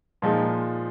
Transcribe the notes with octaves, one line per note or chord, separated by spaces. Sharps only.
A#2 F3 G#3 D#4